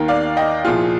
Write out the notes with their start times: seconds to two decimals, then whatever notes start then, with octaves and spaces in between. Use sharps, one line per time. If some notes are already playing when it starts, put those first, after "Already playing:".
Already playing: D#2 D#3 A#4
0.08 D5 F5
0.37 D#5 G5
0.64 C2 A#2 F3 F4 G#4